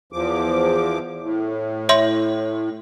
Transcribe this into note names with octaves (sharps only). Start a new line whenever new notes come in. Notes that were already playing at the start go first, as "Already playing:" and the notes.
E2 F3 D6
A2
C#5 E5 C6